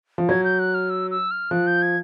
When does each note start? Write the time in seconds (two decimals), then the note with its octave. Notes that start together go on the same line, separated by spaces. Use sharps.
0.18 F3
0.29 F#3 G#6
0.44 G6
0.59 F#6
0.74 F6
0.90 E6
1.11 E6
1.31 F6
1.51 F3 F#6
1.67 G6
1.82 G#6